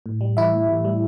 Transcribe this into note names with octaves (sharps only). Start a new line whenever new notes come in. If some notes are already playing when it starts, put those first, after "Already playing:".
A2
G3
E3 E4 E5
A2
A2
G3